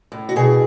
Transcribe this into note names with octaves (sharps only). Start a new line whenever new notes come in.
A2
F#4
B2 G#4